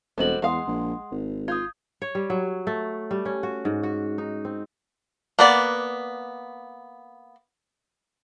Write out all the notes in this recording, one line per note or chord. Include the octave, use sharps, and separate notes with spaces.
E1 G3 C4 F#4 A4 D#5 F#7
E2 G#3 F5 F#5 C6 D#6
A#1
G#1
F4 D#6 G6 G#6
C#5
G3
F#3
A3
G3
C#4
F#4
G#2
F#4
D#4
C4
A#3 B3 D5